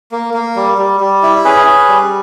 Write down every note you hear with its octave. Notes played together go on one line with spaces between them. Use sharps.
A#3
A#3
G3
G3
G3
E4
C#4 G#4 B4
C#4
G3